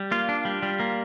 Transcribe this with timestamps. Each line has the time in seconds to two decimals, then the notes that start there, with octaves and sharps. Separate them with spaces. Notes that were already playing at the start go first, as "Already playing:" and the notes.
Already playing: G3
0.11 A#3 F4
0.29 D4
0.45 G3
0.63 G3
0.80 A#3